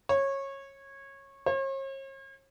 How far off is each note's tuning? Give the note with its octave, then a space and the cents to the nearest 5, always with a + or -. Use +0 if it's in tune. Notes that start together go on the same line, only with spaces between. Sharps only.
C#5 -20
C#5 -45